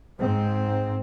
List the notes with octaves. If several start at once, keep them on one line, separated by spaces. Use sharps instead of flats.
G#2 C4